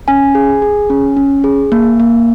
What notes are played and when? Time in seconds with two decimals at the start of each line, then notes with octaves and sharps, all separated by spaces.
0.08 C#4 G#5
0.35 G#4
0.62 G#4
0.90 C#4
1.17 C#4
1.44 G#4
1.72 A#3
2.00 A#3